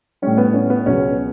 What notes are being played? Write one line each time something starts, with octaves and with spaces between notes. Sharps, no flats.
A2 G3 C#4
B3
C#4
B3
C#2 B2 F#3 C#4